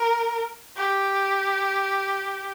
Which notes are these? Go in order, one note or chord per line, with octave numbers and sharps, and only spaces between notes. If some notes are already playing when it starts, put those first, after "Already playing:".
Already playing: A#4
G4